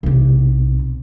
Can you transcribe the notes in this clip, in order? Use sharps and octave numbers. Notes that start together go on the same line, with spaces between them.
B1 C3